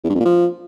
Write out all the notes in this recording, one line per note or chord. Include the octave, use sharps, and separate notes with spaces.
E2
G2
F2
A#2
F3